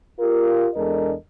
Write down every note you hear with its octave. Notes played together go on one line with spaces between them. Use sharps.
F4 G4 A#4
E2 G#3 D4 A4 A#4 D#5